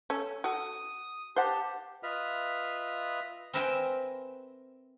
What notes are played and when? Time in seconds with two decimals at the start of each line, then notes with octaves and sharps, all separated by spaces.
0.10 C#4 A4
0.44 F#4 A4 D#6
1.36 G4 C5 F#5 A5
2.03 F4 B4 D#5 E5 F6
3.53 C4 A#4 B4 E5 G5 G#5